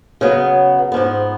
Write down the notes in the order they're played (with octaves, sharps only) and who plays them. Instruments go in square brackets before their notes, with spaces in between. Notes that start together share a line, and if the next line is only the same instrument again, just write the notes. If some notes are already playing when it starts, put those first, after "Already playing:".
[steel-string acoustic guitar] C#3 F#3 B3
G#2 F3 B3